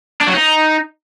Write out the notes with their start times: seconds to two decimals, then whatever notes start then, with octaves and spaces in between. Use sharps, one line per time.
0.21 D4
0.27 F#3
0.34 D#4